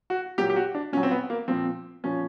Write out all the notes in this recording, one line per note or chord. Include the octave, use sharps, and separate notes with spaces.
F#4
A#2 F#3 G4
G4
F#4
D4
A#2 F#3 C#4
C4
B3
A#3
A#2 F3 C4
A#2 F3 C#4